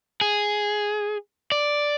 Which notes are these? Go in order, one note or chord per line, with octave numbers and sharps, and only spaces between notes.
G#4
D5